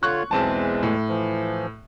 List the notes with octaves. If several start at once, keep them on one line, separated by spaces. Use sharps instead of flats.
D3 F4 C#5 C#6 F#6
B1 E2 E3 G#3 C4 A5
A2
E3 F3